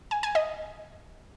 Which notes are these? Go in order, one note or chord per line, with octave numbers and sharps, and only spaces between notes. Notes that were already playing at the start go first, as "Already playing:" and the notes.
G#5
G#5
D#5